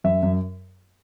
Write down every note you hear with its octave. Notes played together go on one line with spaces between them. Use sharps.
F#2 E5
F#2